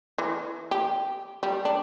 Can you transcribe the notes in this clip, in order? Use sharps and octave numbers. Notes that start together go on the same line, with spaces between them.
E3
G4
G3
D4